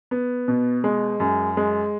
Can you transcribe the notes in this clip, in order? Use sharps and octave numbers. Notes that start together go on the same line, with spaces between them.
B3
B2
G#3
F#2
G#3